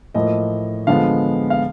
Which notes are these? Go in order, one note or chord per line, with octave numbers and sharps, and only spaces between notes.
A2 F3 A#3 D#5
D3 F3 G#3 B3 F5
F5